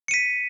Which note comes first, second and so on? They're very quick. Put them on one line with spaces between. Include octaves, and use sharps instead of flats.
C#7 D#7 B6